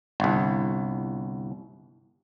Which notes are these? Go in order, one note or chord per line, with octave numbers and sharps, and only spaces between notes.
G1 C2